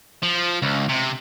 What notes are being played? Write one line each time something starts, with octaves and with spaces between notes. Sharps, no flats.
F3
C#2
C3